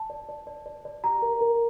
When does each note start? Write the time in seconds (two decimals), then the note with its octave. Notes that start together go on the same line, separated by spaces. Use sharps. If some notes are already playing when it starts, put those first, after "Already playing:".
Already playing: A5
0.10 D5
0.29 D5
0.47 D5
0.66 D5
0.85 D5
1.04 G4 A#5
1.22 A#4
1.41 A#4